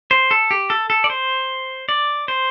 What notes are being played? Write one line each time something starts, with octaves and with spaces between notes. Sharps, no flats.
C5
A4
G4
A4
A4
D5
C5
D5
C5